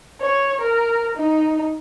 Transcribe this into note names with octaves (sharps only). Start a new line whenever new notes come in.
C#5
A#4
D#4